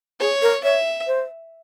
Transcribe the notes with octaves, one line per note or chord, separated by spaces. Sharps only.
G#4 C#5
A#4
C#5 E5
C5